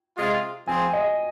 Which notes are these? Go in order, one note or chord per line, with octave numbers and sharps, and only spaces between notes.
C3 G#3 F4
F3 C4 G#4 C5 G#5
D#5